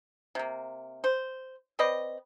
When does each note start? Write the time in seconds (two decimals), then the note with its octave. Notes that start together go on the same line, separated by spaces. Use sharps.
0.35 C3 A#3
1.04 C5
1.79 C4 B4 D5 D#5